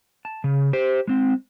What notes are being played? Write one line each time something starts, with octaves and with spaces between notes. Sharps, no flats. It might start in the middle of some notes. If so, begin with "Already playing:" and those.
A5
C#3
G4 C5
G#3 C4